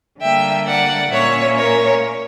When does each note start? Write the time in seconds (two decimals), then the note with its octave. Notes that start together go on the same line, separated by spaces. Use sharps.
0.21 D3 G3 A#3 E5 G5
0.66 D5 F#5
1.11 A#2 A#3 C#4 C#5 E5
1.57 A#4 C#5